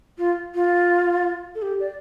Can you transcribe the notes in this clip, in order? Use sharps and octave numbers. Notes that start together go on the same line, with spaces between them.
F4
F4
A4
G4
D5